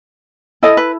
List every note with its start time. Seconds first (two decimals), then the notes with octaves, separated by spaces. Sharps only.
0.63 E4 A4 D#5
0.77 B4